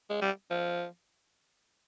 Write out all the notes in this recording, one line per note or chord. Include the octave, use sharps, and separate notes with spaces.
G#3
G3
F3